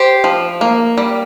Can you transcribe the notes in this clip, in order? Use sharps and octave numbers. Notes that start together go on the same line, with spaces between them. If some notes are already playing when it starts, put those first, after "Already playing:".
Already playing: G4 C5
F3
A#3
G3